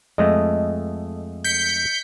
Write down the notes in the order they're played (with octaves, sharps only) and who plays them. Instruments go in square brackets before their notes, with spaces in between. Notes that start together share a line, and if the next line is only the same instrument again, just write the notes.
[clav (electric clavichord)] F2 G#3 A3 [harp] D#5
[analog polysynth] G6 B6 C#7